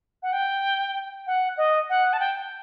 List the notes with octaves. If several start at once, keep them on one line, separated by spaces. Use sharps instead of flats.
F#5
G5
F#5
D#5
F#5
A5
G5